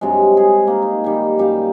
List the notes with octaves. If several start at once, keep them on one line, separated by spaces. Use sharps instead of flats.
G2 C3 F#3 G#3
G#4
A#3 D#4
D#4
D#3 G3
F#2 G3 D#4 F5